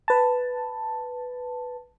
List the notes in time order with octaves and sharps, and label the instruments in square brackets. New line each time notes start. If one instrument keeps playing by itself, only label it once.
[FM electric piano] B4 A5